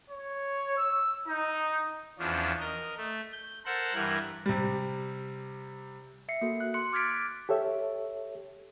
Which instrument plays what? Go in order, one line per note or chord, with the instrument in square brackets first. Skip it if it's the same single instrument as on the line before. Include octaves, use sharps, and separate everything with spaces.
[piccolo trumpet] C#5
E6
D#4
[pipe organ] E2 F3 C#4 D4
A#4 D#5
A3
G6
A4 A#4 C5 F#5
G2 E3 A#4 F#6 G#6
[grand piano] C3 G3
[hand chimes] E5 C7 C#7
A#3 F#4 A4
F#6
C6 F#6 C#7
D6 F6 G#6 A6 B6 D7
[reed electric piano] G4 A4 C#5 E5